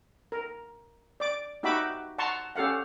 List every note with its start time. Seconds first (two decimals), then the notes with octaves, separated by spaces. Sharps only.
0.32 A#4
1.20 D5 D6
1.63 D#4 F#4 G4 E5 B5 D6
2.18 F#5 A5 A#5 C6 C#6
2.56 C#4 G4 A4 F5 F#5